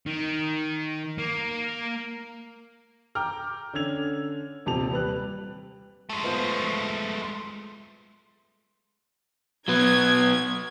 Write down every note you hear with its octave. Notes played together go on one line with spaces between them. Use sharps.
D#3
A#3
G5 A#5 D6 F6
D3 C#4 E6 G#6 F7
D#1 C3 A5 F7
G3 B4 F#6
G#3 A3
B3 F4 C5
C6
F#3 B3 G#6